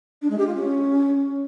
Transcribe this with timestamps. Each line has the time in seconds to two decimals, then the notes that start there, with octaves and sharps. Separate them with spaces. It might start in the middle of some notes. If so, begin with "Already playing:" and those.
0.22 D4
0.30 G#3
0.38 G4
0.47 F4
0.55 C#4